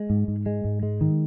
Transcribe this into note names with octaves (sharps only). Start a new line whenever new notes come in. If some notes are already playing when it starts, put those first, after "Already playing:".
Already playing: G#3
G#2
G#2
G#3
G#2
G#3
D#3